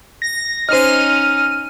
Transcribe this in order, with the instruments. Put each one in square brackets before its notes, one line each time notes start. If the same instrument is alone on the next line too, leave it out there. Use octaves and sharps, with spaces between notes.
[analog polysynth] A#6
[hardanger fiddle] C#4 D#4 [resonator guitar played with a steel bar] C5 D#5 [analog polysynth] F6 D#7